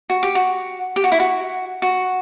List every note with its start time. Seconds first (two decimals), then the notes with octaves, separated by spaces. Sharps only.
0.10 F#4
0.23 G4
0.35 F#4
0.96 G4
1.04 F#4
1.12 E4
1.20 F#4
1.82 F#4